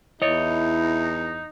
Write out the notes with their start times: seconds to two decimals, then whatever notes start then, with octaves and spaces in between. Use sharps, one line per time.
0.22 E2 D#4 E4 C#5 D#5